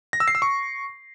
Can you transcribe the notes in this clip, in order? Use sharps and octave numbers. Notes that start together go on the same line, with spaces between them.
A#6
E6
C7
E6
C#6